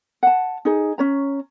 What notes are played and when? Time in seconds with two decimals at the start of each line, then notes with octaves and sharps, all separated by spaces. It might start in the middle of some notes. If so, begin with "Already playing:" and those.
0.23 F#5 A5
0.65 D#4 G#4
0.98 C#4 C#5 A#5